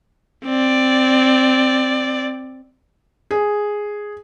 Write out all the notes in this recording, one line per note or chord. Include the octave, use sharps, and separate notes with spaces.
C4 D5
G#4